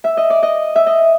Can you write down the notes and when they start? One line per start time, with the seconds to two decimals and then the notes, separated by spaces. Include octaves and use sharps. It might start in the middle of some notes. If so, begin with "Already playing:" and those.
0.04 E5
0.17 D#5
0.30 D5
0.43 D#5
0.76 E5
0.87 D#5